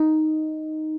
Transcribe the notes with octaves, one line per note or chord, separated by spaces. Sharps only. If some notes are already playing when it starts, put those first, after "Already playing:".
Already playing: D#4